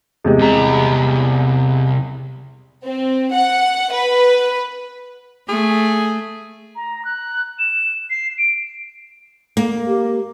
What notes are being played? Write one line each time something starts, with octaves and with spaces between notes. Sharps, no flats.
E2 C3 G#3
C2 A#5
C4
F#5
B4
A3 G#4
A#5
F#6
E7
C7
D7
A#3
G4